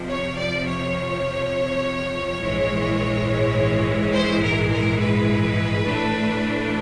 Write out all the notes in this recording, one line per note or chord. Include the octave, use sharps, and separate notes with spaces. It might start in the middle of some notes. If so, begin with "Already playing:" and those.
Already playing: F2 C3 F3
C#5
D5
C#5
A#1 G#2 E3 G#3
C5
A#4
A#4
B4
A2 E3 A3 D4